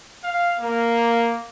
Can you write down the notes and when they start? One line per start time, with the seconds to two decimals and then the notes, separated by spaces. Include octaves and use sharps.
0.24 F5
0.60 A#3